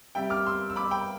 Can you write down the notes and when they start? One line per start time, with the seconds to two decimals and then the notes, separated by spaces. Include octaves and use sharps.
0.15 C3 G3 E5 G5
0.30 D6 F6
0.46 C6 E6
0.70 E6
0.76 B5 D6
0.91 G5 B5